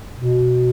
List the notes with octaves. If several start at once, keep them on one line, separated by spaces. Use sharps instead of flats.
B2